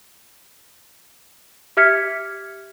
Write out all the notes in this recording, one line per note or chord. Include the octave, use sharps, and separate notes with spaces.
G4 E5 F6 G#6 B6 C#7